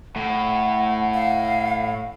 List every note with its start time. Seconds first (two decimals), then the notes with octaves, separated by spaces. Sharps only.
0.16 A2 F#5
1.14 F5